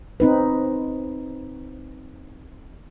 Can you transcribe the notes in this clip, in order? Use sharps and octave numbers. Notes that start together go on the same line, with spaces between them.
C4 D#4 B4